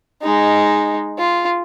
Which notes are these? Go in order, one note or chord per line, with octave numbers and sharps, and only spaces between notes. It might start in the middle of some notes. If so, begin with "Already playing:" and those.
G#3 D#4
F4